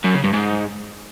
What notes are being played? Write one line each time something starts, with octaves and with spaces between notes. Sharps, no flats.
F#2
C#3
G2
G#2